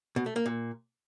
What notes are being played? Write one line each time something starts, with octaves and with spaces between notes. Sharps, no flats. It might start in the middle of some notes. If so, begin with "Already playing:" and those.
B2
A3
A#3
A#2